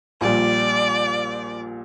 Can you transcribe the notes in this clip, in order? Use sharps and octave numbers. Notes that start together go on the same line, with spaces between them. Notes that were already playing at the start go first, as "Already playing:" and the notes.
A#1 A#2 G3 D5